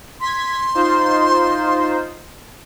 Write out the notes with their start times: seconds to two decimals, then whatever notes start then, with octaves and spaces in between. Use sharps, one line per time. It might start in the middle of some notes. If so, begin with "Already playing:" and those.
0.21 C6 G#6 B6
0.75 D#4 F4 C5